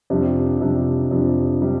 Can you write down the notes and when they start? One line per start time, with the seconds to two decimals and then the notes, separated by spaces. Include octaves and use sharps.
0.10 F2 C3 G3 D4
0.60 F2 C3 G3 D4
1.11 F2 C3 G3 D4
1.61 C3 G3 D4